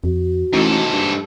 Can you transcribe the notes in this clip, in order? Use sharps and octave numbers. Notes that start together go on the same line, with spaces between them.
F2 F#4
A1 G#2 D#4 A4
G2